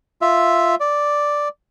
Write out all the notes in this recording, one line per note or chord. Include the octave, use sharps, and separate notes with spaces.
F4 E5
D5